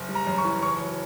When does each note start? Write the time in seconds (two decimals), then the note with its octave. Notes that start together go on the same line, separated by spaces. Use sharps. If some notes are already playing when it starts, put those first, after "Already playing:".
Already playing: F#1
0.09 G3
0.15 A#5
0.27 F#2
0.38 C#6
0.44 E3
0.62 F#1 C#6
0.81 F#3